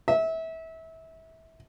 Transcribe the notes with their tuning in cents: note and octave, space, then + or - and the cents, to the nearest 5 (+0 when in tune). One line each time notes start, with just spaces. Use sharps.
E5 -25